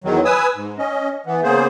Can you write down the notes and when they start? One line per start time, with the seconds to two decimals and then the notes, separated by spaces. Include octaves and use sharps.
0.04 E2 D#3 F#3
0.25 B4 G#5 D#6 E6
0.55 G#2
0.78 C#4 D#5
1.26 E3 B3
1.43 C#3 A#3 B3 G#4 C5